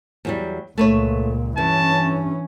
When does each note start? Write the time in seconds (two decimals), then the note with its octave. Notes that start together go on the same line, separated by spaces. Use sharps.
0.25 E2 F#3 G3
0.78 C#2 A#2 A3 B4 C#5
1.58 G2 E3 C#4 A5